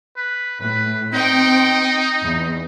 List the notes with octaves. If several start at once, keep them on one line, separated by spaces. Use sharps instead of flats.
B4
A2 B4
C4 D#4 G5
E2